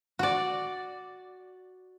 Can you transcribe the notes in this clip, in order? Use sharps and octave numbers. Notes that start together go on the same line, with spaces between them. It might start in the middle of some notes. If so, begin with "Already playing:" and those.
F#4 D5